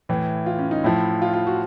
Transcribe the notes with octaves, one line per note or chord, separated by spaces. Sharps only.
A2 E3
F4
C#4
D#4
A2 F3 E4
F4
F4
F#4